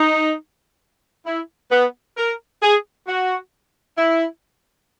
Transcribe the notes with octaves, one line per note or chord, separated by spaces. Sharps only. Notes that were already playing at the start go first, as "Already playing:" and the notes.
Already playing: D#4
E4
B3
A#4
G#4
F#4
E4